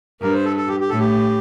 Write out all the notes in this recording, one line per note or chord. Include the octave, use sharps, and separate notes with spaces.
G2 A#4
C5
A4
A4
G4
G4
A2 A4
G4